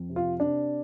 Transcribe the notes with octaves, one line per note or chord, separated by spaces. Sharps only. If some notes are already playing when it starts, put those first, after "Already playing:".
Already playing: F2
C3
F4
C3 D4